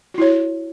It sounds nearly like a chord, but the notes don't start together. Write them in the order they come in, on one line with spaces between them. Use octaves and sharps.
F#4 E4 C#5